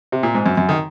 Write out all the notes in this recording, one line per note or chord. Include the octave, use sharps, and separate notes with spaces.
C3
A#2
G#2
F#2
F#2
D#3